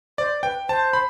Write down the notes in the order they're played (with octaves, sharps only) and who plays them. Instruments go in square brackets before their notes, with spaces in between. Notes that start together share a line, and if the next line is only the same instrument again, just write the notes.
[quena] C5 [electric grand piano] D5
[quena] B4 [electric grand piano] G5
[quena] C5 [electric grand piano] A5
[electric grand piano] B5